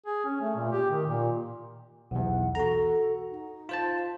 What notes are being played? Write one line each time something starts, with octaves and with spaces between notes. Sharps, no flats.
G#4
C#4
A3
A#2
G4
D#3
A#2
B1 E2 F#5
F#4 A4 A#5
D#4
F4 C5 A5